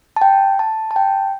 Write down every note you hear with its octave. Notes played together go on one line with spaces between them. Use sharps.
A5
G5
A5
A5
G5